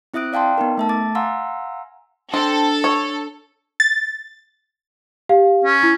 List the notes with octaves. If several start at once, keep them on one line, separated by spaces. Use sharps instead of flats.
C4 E4 E5 D#6 F#6 D7
D5 F5 G5 A5 C6
B3 D#4 A#4
A3 E5 A5
D6 A6
F5 F#5 G#5 A#5 C6 E6
C4 D4 A4
C#5
A6
G4 F5
C#4
E4